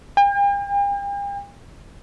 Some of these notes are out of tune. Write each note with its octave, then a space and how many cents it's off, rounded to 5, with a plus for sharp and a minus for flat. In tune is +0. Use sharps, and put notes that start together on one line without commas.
G5 +45